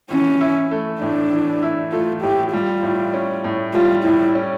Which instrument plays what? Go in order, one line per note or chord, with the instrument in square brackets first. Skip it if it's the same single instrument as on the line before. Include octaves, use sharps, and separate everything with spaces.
[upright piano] E3 [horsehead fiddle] C#4
[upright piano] E4
A3
[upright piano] A2 [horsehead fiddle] D4
[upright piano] E3
E4
[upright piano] A3 [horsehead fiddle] F4
[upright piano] A2 [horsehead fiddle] G4
[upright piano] G3 [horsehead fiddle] F4
[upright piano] A2
C#4
A2
[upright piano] G3 [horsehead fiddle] F4
[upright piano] A2 [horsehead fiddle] E4
[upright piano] C#4